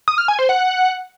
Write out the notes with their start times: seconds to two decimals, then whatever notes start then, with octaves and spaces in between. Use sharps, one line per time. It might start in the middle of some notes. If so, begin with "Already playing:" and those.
0.08 D#6
0.18 F6
0.28 G#5
0.39 C5
0.49 F#5